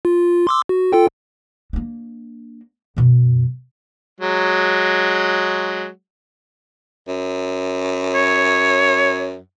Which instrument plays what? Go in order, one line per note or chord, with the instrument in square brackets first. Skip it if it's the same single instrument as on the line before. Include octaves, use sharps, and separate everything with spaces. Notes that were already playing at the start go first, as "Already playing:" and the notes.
[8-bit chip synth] F4
C6 D6 E6
F#4
F4 A4 G5
[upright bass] A#3 D4
F#2 B2
[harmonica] F#3 G#3
[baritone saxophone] F#2
[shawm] C#5